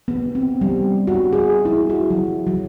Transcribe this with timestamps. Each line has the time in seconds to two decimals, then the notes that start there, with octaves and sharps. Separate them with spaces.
0.08 B3
0.35 C4
0.61 G3
1.07 F#4
1.33 G#4
1.65 E4
1.90 F#4
2.10 F#3
2.47 F#3